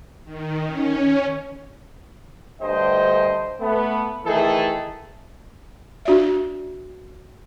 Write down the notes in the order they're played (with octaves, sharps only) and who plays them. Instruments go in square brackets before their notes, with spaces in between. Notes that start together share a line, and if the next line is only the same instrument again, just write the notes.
[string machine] D#3
C#4
[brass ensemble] D2 G2 C5 D#5 G5
A3 B3
D#3 E3 A3 G#4 A4
[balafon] D4 F#4 D5 E5